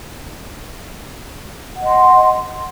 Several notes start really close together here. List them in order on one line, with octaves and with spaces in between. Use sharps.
F#5 D#5 C6